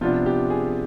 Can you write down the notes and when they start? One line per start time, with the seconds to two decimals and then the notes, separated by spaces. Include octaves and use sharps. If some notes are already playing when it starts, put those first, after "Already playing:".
0.01 C3 F3 B3 D4 F4
0.26 G4
0.50 G#4